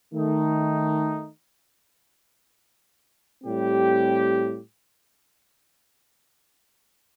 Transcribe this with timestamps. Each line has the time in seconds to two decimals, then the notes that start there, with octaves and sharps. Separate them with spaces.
0.13 D#3 A3 D#4
3.44 A2 G3 C4 G4